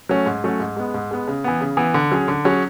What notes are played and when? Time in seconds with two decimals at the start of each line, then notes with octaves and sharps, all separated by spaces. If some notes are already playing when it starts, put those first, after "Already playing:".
0.09 F#3 A3 C#4
0.26 G#2
0.44 F#3 A3 C#4
0.60 G#2
0.77 G#3 B3
0.94 G#2
1.11 G#3 B3
1.27 C#3
1.44 E3 B3
1.61 C#3
1.77 E3 B3
1.94 D3
2.12 F#3 C#4 G#4
2.28 D3
2.45 F#3 C#4 G#4